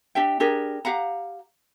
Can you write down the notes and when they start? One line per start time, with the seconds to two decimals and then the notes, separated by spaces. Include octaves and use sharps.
0.15 D4 G4 E5 G5
0.40 D4 G4 G#4 A#4
0.85 G4 F5 F#5 A#5